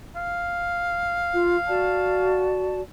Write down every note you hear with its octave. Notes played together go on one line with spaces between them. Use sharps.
F5
F4
F#4 D5 A5